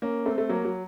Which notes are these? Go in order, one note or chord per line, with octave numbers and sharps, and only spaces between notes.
A#3 C#4
A3 C4
A3
F#3 A#3
F#3